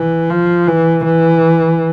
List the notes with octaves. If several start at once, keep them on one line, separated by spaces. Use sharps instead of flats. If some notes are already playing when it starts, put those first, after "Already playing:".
Already playing: E3
F3
E3
E3